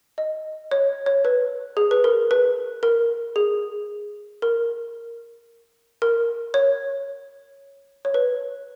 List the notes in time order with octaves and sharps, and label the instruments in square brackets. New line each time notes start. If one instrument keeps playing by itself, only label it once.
[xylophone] D#5
C#5
C#5
B4
G#4
B4
A#4
B4
A#4
G#4
A#4
A#4
C#5
C#5
B4